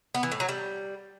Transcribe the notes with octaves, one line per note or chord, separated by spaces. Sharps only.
B3
E3
A2
F#3
G3